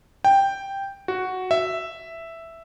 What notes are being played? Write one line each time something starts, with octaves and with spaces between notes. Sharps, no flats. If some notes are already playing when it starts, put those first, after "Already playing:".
G5
F#4
E5